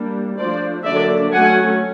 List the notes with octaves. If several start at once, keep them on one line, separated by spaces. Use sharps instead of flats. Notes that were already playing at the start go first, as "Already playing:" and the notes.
Already playing: G3 A#3 D4
F3 A3 D4 C5 D5
D3 F#3 A#3 D4 D5 E5
F#3 A3 C#4 F#5 G#5